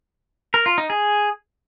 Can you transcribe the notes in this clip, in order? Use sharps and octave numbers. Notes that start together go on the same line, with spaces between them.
A#4
F4
D#4
G#4